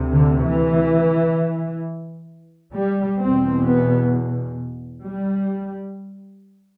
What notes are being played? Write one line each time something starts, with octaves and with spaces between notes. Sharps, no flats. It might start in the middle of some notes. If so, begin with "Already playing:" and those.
Already playing: D2 C3
D3
E3
G3
E2 B2 C4
B3
G3